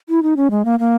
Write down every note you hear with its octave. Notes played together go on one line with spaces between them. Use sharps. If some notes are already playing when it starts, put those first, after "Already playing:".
E4
D#4
C#4
G#3
A#3
A#3